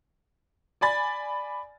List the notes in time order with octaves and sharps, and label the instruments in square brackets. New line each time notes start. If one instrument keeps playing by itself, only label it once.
[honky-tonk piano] D5 G#5 B5 A6